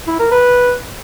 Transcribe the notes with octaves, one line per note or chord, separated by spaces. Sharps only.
E4
A#4
B4